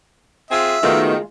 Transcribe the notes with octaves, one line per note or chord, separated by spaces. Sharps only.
C4 F4 G#4 E5
D#3 G#3 A3 B3 F4 F#4